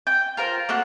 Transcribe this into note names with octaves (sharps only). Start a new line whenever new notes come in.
G5
F4 A#4 C5
A3 A#3 F#4 F#6